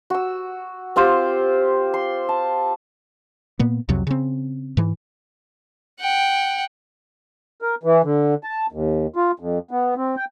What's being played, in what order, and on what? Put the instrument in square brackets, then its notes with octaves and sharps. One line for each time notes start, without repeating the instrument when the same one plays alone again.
[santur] F#4 E6
C4 F4 G4 C5
C6
A5
[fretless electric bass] A#2 A#3 B3
C2 F2 C3 F#3
C#3 C4
G#2 E3
[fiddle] F#5 G5
[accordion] A#4
E3
D3
A5
D#2
F4
F2
B3
C4
G5